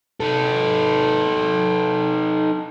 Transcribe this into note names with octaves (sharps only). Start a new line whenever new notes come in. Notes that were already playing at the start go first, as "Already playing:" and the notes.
D#4 A4